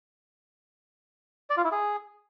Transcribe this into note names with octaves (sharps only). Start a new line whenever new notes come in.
D5
F4
E4
G#4